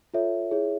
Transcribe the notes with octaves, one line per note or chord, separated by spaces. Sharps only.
F4 A4 C#5 E5
E4 G#4 C#5